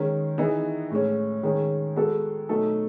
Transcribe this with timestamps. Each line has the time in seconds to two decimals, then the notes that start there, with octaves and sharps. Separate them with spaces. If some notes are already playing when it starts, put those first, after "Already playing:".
Already playing: D#3 G#3 C#4
0.38 E3 B3 D#4 G#4
0.91 A2 G#3 C#4
1.43 D#3 G#3 C#4 G#4
1.96 G#3 B3 F#4 A4
2.49 B2 F#3 A3 D#4 A4